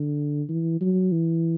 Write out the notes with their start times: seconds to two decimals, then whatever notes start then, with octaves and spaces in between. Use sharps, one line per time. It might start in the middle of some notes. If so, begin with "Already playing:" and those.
Already playing: D3
0.49 E3
0.81 F#3
1.12 E3